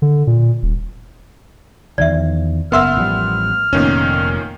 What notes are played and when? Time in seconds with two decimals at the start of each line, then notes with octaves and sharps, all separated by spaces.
0.02 D3
0.27 A#2
0.63 D#1
1.98 E2 D#3 F3 D5 E5
2.72 F#1 B3 A#4 E5 F#5 C6 E6 F6
2.95 A1 F3 G3
3.73 F1 A#2 D#3 A3 B3 C#4